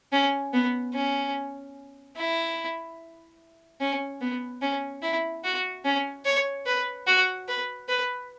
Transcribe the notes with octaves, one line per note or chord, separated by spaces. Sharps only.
C#4
B3
C#4
E4
C#4
B3
C#4
E4
F#4
C#4
C#5
B4
F#4
B4
B4